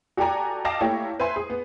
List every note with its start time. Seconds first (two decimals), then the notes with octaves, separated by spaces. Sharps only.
0.17 F#4 G4 A4 D5 G#5 A#5
0.65 D#5 F5 G5 A5 D6 A#6
0.80 A3 A#3 E4 G4 C#5
1.20 B4 C5 E5 G#5 C6
1.36 G#4
1.50 B3